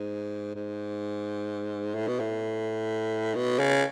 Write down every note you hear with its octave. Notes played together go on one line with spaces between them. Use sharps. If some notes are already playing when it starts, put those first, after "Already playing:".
Already playing: G#2
G#2
A2
B2
A2
B2
C#3